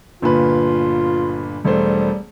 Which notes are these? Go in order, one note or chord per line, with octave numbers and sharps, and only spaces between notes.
G1 A#2 F4 B4
E1 G3 A3 C5